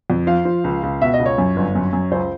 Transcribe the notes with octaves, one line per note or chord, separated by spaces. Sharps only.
F2
F3 F5
F3
C#2
C#2
B2 E5
D#5
C#2
C#5
F#2
G1
F#2
F#2
C#2 C5